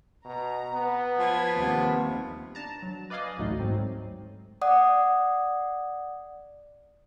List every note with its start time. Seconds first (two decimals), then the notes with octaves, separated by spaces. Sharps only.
0.25 B2 A#5
0.73 B3
1.19 F3 B4 G#6
1.57 D#2 C3 G3 B3
2.55 D4 A5 A#5
2.82 F#3
3.10 B4 D5 D#5 F5 G#5
3.38 A1 D2 F#3 A3 D#4
3.59 G#2 F#3 C4
4.62 D5 F#5 D#6